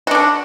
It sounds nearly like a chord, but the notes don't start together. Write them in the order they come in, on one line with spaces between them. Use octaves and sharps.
F#4 D4 D3